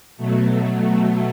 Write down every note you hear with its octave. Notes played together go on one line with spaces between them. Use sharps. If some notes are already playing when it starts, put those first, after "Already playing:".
B2 F#3 A3